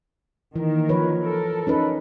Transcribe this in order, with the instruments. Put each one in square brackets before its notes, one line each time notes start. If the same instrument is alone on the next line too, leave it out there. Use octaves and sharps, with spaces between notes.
[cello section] D#3 A#3 A#4 [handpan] E3
[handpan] F3 B4 C#5
[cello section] A4 A#4
[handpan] C#4 D#4 B4